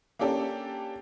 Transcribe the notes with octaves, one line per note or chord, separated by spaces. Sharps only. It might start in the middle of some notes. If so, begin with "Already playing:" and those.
A#3 C#4 D4 G4 A4